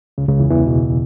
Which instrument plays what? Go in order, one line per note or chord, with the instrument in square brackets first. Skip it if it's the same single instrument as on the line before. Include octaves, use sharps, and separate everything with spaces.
[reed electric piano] C#2 C#3
C#2 C#3
E2 E3
E2 E3
B2